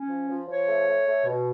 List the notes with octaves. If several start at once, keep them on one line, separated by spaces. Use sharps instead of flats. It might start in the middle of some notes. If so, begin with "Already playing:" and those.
Already playing: C#4
F3
F3
F3 C#5
A3
A3
A3
B2